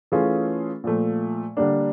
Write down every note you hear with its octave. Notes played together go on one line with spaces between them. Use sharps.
E3 A3 C#4 F4 G#4
A#2 F3 A3
D3 G3 A#3 D4